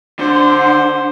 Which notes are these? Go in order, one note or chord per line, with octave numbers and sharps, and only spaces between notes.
D3 C5